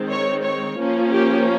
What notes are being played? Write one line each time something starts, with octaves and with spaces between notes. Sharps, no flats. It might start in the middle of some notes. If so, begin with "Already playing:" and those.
Already playing: D#3 G#3 C4
C#5
C#5
F3 A#3 C#4
G4